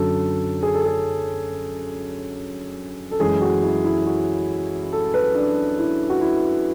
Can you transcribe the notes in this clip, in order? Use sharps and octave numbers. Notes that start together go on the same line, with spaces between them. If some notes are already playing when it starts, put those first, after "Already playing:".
Already playing: F#2 D3 F#3 A4
G#4
A4
G#4
A4
F#2 E3 G#3 G#4
F#4
E4
E4
F#4
A4
B4
D4
E4
F#4
E4